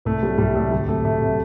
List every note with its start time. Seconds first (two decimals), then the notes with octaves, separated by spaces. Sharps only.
0.05 C2 A3
0.22 C3 F#3 G3
0.38 C2 G3
0.56 C3 F#3 A3
0.72 D2 G3
0.88 C3 F#3 A3
1.04 D2 A3
1.21 C3 F#3